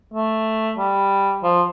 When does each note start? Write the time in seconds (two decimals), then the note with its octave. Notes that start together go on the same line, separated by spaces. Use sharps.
0.13 A3
0.78 G3
1.43 F3